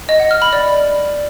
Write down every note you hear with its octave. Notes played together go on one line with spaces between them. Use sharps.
D#5
F#5
F6
B5
D5